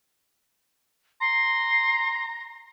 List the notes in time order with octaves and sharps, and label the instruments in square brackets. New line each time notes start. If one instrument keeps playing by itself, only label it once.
[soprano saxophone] A#5 [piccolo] C6